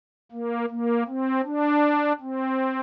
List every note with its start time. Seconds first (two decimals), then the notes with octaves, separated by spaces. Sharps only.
0.31 A#3
0.69 A#3
1.07 C4
1.45 D4
2.20 C4